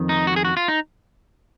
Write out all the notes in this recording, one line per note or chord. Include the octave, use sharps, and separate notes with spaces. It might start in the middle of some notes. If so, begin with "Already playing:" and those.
Already playing: F2 D#3
D#4
F#4
G#4
F#4
F4
D#4